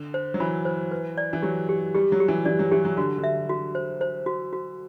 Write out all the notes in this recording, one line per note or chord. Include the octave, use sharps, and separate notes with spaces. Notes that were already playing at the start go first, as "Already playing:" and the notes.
Already playing: D3
C5
F#3
E3 B5
C5
B4
D5
E3
F#3 G4
G4
G3 G4
F#3
G4
E3
E3 D5
F#3
E3 G4
F#3
D3 F#4
D3
E5
F#4
C5
C5
F#4
F#4